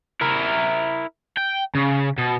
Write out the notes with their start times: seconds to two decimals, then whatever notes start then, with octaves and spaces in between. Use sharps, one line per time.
0.21 E4 A#4
1.37 G5
1.75 C#3
2.18 B2